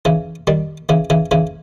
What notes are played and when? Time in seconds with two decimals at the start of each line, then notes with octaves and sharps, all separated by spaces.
0.05 C#3 E3
0.47 D#3 G3
0.89 C#3 E3
1.10 C#3 E3
1.31 C#3 E3